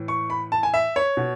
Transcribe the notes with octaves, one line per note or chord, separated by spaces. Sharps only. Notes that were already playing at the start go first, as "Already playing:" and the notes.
Already playing: A2 E3
C#6
B5
A5
G#5
E5
C#5
B2